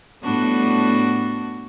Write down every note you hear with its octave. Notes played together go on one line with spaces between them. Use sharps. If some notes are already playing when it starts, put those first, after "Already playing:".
A2 G3 B3 D4 F#4